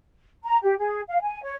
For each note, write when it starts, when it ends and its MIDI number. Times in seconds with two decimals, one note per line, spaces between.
0.44 0.57 82
0.63 0.74 67
0.79 1.01 68
1.09 1.21 77
1.21 1.41 80
1.43 1.54 73